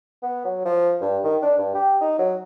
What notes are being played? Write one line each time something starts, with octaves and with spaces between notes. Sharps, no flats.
B3
F#3
F3
G2
D#3
D4
G2
G4
D#4
F#3